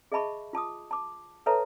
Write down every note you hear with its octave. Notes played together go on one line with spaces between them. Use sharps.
G#4 D#5 E5 A5 B5 C#6
F4 A5 D6 D#6
A5 D6
A4 B4 C#5 E5 A5 A#5